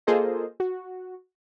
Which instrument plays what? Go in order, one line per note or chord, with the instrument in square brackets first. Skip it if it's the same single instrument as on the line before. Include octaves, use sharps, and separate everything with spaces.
[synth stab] A#3 F4 G#4 A4 C5 D#5
F#4